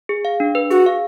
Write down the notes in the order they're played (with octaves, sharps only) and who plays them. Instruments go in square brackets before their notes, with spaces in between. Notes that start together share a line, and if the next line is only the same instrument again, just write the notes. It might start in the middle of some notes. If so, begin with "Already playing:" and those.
[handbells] G#4
F5
D4
B4
[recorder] F#4 [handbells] G#4
[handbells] F5